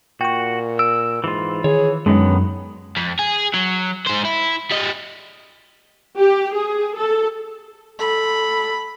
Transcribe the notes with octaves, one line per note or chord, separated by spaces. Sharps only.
A#2 F#4 G5 C#6
E6 D7
G#2 E3 F4
D#3 G#4 C#5
F#2 D3 D#3 G#3 B3 C#4 D#4
F2
G#4
F#3
G#2 C5
E4
G3 D#5
G4
G#4
A4
A4 B5